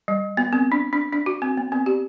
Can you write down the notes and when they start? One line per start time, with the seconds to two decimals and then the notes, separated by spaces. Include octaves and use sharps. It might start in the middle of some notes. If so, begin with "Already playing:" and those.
0.08 G3
0.37 B3
0.53 C4
0.72 D4
0.93 D4
1.13 D4
1.26 F#4
1.42 C4
1.57 B3
1.72 C4
1.86 G4